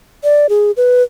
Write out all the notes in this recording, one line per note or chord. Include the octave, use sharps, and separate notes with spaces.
D5
G#4
B4